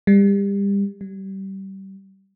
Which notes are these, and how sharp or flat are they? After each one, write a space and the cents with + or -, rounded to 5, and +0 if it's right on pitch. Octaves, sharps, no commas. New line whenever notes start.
G3 +30
G3 -25